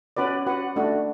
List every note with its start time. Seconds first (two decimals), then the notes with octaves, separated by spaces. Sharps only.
0.17 C#4 F#4 B4 D5
0.47 F#4 B4 F#5
0.76 A3 D4 F#4